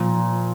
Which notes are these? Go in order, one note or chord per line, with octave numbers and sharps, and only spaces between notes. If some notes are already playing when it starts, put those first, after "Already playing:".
Already playing: A#2 F3